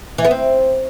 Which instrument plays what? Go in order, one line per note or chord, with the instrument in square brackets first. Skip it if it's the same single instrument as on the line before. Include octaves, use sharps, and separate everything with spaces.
[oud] E3
B3
C4